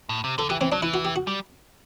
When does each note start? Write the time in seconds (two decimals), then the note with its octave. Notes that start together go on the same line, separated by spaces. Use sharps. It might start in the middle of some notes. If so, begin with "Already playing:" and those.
0.09 A2
0.24 C3
0.38 D3 A4
0.49 E3 G4
0.61 E3 C4
0.72 F#3 D4
0.82 E3 E4
0.94 F#4
1.05 G4
1.16 F#4
1.27 G3